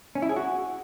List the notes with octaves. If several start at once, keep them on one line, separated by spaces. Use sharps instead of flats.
C#4
E4
G#4
F#4